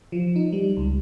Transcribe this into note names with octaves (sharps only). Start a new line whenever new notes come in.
F3
D#4
G3
C#2